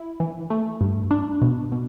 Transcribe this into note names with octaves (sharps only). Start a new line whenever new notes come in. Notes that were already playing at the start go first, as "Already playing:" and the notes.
Already playing: E4
E3
A3
G2
D4
B2
B2